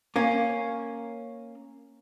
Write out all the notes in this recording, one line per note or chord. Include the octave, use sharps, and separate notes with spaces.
A#3 C#4